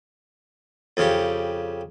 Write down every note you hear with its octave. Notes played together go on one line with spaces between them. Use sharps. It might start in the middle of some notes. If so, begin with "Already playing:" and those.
F2 C#3 G4